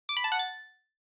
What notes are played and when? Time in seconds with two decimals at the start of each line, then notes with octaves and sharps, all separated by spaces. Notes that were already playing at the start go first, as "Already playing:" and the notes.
0.09 D6
0.17 B5
0.24 A5
0.32 F#5
0.39 A6